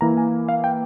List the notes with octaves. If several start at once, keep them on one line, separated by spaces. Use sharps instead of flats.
E3 A#3 E4 A#5
G#5
F5
G5